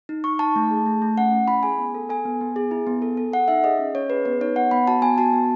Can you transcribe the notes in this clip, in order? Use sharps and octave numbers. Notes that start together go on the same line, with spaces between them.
D#4
D#4 C#6
D#4 A5
A3
G#4
A3
A3
C#4 F#5
C#4
E4 B5
G#4 G#5
B3
A4
A4 G#5
B3
B3
G#4
E4
B3
A4
A4
A4 F#5
D#4 E5
G#4 D#5
C#4
C#4 C#5
G#4 B4
B3 B4
D#4 C#5
B3 F#5
B3 B5
F#4 A5
B3 G#5
F#4 A5
B3